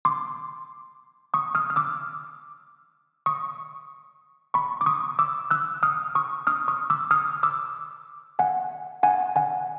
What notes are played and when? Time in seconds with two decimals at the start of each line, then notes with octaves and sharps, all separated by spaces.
0.05 C6 D6
1.34 C#6 D#6
1.55 D#6 F6
1.70 F6
1.76 D6 E6
3.26 C#6 D#6
4.54 B5 C#6
4.81 D6
4.86 C#6 D#6
5.19 D6 E6
5.51 E6 F#6
5.83 D#6 F6
6.15 C#6 D#6
6.47 D#6 F6
6.68 C#6 D#6
6.90 D6 E6
7.11 D#6 F6
7.43 D6 E6
8.39 F#5 G#5
9.03 F#5 G#5
9.36 F#5 G#5